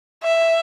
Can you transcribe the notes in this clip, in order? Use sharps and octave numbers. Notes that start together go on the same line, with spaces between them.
E5